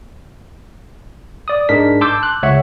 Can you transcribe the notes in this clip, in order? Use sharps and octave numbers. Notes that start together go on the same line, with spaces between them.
D5 D#6
G#2 G#3 D4 A#4 B6
A5 C6 D6 E6 G6
F#6
C#2 C#5 E5 F#5